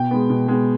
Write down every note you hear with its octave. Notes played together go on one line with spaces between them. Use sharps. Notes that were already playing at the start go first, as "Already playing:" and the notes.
Already playing: B2 G5
G#3 B3
B2
G#3 B3